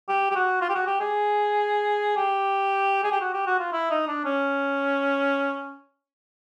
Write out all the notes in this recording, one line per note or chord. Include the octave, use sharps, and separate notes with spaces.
G4
G4
F#4
F4
G4
F#4
G4
G#4
G4
G#4
G4
F#4
G4
F#4
F4
E4
D#4
D4
C#4